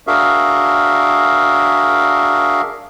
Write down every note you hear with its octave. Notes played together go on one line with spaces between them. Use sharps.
D4 F#4 G#4 A#4 E5 F5